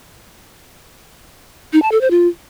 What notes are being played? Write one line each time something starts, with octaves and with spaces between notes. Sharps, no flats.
D#4
A5
A4
C5
F4